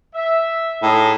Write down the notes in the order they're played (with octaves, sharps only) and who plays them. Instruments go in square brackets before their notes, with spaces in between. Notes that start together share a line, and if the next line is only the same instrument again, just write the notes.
[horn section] E5
[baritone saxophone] A2 [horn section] D#4 E4 G#4